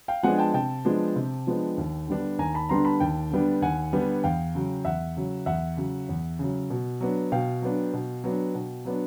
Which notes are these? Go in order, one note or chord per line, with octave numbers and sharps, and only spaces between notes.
F5 G5
F3 G#3 B3 D4 F#5 G#5
G5 A5
C3 G5 A5
F3 G#3 B3 D4
C3
F3 G#3 B3 D4
D#2
D3 G3 B3 D4
D#2 G#5 A#5
A5 B5
D3 G3 B3 D4 A#5 C6
A5 B5
D#2 G5 A5
D3 G3 B3 D4
D#2 F#5 G#5
D3 G3 B3 D4
E2 F5 G5
C#3 F#3
E2 E5 F#5
C#3 F#3
E2 E5 F#5
C#3 F#3
E2
C#3 F#3
B2
F#3 B3 D4
B2 F5 G5
F#3 B3 D4
B2
F#3 B3 D4
B2
F#3 B3 D4